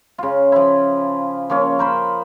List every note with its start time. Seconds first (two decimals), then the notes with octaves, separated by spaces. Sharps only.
0.18 C#3 F4
0.52 F3 E4
1.50 F3 A#3 C#4
1.79 A#4 C5 B5